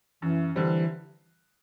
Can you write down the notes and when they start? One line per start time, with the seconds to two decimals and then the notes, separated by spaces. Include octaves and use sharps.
0.22 F#2 E3
0.56 D3 E3 G3 C4